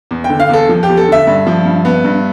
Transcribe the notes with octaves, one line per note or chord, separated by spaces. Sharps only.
E2
G5
D3
F5
E2 A4
F3
G4
E2
A4
D3 E5
G2
F3
G2
B3
G2